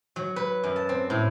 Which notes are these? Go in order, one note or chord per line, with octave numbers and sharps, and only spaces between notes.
F#3
B4
F#2
A5
C4
A2